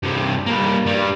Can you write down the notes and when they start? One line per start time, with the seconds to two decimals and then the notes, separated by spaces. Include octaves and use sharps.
0.03 G2 C3
0.47 G3 A#3
0.86 G2 G3